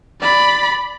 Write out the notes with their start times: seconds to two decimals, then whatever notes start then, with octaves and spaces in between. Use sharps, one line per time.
0.21 D5 B5